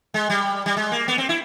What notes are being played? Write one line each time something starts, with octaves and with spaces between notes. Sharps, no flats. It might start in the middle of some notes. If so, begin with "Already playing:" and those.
G#3
G3
G3
G#3
A#3
B3
C4
E4